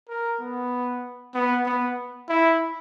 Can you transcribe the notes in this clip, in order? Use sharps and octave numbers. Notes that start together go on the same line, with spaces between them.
A#4
B3
B3
B3
E4